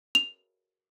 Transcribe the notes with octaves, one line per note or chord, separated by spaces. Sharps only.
F7